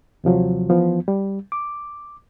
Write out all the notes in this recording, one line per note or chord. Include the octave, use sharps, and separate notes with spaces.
D#2 C3 F3 F#3
E3 F3 B3
G3
D6